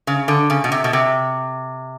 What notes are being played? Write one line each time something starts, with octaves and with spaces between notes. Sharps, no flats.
C#3
D3
C#3
B2
C3
B2
C3